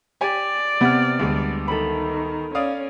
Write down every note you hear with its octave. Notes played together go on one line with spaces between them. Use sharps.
G4 D5 G#5
C3 B3 F6
D2 G3 G#3
D#3 A4 B5
C#4 D5 F5 D#6